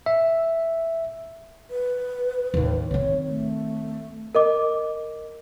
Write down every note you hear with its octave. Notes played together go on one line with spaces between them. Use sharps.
E5
B4
A1 D#2
D#3 C4 C#5
A3
A#4 D#5 D6